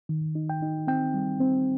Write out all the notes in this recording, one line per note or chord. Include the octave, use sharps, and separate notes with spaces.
D#3
D#4
G5
D#4
C4 G5
G3
C4